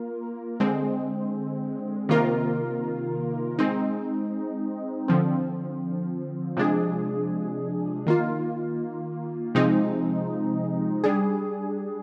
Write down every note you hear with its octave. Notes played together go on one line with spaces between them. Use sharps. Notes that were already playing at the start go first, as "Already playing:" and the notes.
Already playing: A#3 F4 A#4
D3 G#3 C4
C3 D#3 A#3 F4 A#4
G#3 C4 D#4
D3 F3 C4
C3 F3 G#3 D4 G#4
D#3 A#3 F4
C3 F3 G#3 C4 D#4
G3 D4 G#4